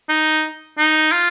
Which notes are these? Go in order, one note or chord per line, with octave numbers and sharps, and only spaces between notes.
D#4
D#4
F4